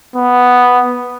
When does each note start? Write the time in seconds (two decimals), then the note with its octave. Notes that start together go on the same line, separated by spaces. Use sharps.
0.16 B3